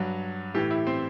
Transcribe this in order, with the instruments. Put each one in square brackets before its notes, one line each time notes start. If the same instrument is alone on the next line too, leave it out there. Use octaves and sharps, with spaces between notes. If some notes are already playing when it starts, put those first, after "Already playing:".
Already playing: [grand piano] G2 F#3
A2 E3 G4
E4
C4